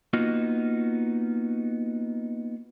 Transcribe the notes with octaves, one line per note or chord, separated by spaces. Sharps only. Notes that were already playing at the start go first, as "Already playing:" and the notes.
A#3 B3 D#4 F4 F#4